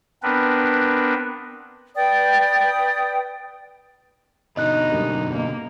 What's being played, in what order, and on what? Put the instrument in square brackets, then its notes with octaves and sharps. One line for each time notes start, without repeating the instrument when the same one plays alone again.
[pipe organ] B3 C4 D4 A#4 B4
[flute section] B4 D5 G5 D#6
[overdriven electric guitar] B2 D3 [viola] D#4 [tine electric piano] D#5 F#6
[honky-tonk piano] F#2 G3 A#3
[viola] A#3 [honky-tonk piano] D#5